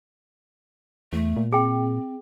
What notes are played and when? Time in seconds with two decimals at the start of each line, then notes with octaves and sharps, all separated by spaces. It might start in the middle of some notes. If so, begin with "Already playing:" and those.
1.13 E2 A3
1.37 A#2
1.53 C4 G#4 G5